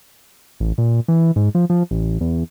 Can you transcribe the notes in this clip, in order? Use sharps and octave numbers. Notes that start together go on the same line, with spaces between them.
A1
A#2
E3
G#2
F3
F3
A1
E2